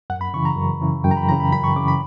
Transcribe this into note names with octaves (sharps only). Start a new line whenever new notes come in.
F#2 F#5
B5
C#3 E3 C#6
A#5
F#2
C#3 E3
F#2 G5
A#5
B5
C#3 E3 A#5
B5
F#2 B5
C#6
C#3 E3 D6
B5